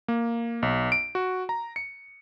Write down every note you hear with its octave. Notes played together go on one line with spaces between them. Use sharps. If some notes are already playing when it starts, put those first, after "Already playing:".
A#3
B1
D7
F#4
A#5
C#7